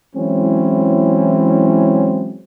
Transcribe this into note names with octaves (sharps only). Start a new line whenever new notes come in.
E3 F#3 G#3 C4 C#4 E4